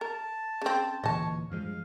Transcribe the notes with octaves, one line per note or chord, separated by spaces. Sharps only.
A#4 A5
C#3 C4
D1 A#2 E3 C#5 D#5 A5
G2 F3 G#3 F5